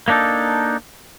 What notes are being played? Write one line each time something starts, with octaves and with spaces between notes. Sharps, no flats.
A#3 B3 D4 D#4 A4